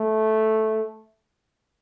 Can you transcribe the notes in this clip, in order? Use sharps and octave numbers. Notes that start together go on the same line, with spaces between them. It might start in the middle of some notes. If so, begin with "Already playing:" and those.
Already playing: A3